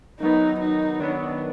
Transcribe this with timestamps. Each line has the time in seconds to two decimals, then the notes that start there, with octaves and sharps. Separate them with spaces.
0.20 D#3 F#3 B3 D#4
0.60 D#4
1.00 D#3 F#3 B3 D4